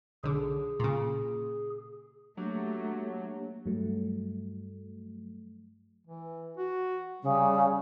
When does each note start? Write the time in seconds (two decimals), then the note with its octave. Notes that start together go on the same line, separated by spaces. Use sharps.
0.24 B1 D3 G#4
0.80 A#2 C#3
2.37 F#3 A3 A#3 D4 G4
3.66 G2 F#3 A3
6.07 E3
6.57 F#4
7.22 C#3 G3